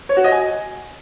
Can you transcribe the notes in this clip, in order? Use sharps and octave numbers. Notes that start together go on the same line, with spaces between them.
C#5
F#4
D#5
G#5